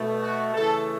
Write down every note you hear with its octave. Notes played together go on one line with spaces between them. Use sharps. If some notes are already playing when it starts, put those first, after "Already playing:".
Already playing: B2 A3
F#4
C#3 E3 A3 A4